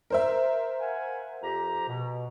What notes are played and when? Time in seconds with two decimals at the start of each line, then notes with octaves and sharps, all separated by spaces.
0.10 A#4 C5 E5
0.79 F5 F#5 G#5
1.42 F2 G4 A#5
1.88 B2